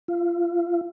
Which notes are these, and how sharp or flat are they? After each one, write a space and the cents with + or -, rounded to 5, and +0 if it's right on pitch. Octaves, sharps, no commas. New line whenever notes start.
F4 -25